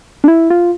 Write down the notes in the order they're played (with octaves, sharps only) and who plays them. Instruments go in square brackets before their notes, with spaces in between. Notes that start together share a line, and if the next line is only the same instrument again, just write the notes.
[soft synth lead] D4
E4
F4